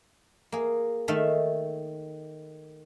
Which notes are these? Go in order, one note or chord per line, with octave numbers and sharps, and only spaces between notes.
A#3 G#4
D#3 A3 E5 F5 A5